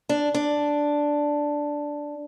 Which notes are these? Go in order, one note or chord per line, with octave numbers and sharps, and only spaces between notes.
D4
D4